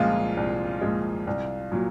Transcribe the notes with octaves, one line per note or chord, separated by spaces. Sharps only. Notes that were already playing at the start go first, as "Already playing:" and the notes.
Already playing: C2 A#2 F3 G#3 F4
C2
A#2 F3 G#3
C2
A#2 F#3